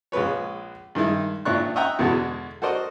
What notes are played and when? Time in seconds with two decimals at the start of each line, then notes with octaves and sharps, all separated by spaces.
0.12 A#1 G#3 C#4 B4 C#5
0.95 G2 D#3 G#3 D#4 E4
1.45 G#1 A#2 D4 E4 C#6 F#6
1.76 D#5 E5 F#5 G5 A#5
1.99 E2 B2 D3 G#3 F#4 A4
2.62 F#4 A4 A#4 C5 D5 D#5